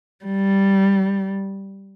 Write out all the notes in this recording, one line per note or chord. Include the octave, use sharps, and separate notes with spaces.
G3